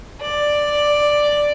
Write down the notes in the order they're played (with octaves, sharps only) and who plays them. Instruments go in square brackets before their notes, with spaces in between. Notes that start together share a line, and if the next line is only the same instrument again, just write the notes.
[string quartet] D5